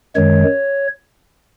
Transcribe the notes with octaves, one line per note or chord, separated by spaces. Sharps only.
F#2 D#3 G#3 C#5